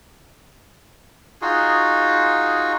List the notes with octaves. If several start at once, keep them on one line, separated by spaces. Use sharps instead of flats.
D#4 F4 F#4 G#4